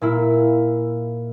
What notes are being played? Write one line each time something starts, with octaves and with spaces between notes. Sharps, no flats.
A#2 A#3 E4